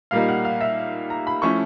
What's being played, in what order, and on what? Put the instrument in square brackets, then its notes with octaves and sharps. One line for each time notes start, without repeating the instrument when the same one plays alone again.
[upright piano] A#2 G3 A#3 D#4 F5
F#5
F5
E5
A#5
B5
F3 A3 C#4 E4 C#6